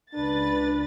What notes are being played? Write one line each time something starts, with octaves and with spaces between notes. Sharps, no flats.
C#2 D4 B4 A6